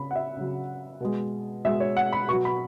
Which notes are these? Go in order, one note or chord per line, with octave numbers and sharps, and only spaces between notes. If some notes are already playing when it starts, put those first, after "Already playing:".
Already playing: C#3 B5
F#5
E5
C#3 F#3
B2 G#3
B2 G#3 E5
C#5
F#5
B5
B2 F#3 C#6
B5